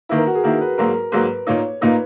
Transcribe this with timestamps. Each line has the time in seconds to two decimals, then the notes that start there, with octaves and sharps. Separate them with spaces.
0.09 D#3 A#3 E4 B4
0.18 A#4
0.27 F#4
0.35 G#4
0.43 D#3 A#3 E4 A#4
0.61 B4
0.78 G#2 F#3 A#3 A#4
1.12 G#2 F#3 A#3 B4
1.47 A#2 A#3 D#4 C#5
1.81 A#2 A#3 D#4 B4